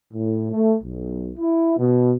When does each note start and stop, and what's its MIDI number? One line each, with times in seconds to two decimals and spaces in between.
0.13 0.49 45
0.52 0.73 57
0.82 1.30 35
1.38 1.76 64
1.78 2.14 47